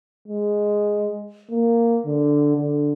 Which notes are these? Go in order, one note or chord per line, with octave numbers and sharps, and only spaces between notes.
G#3
A#3
D3
D3